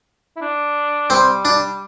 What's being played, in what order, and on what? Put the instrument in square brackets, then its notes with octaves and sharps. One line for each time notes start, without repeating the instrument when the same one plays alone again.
[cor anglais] E4
D4
[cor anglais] G3 [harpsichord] C4
[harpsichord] D4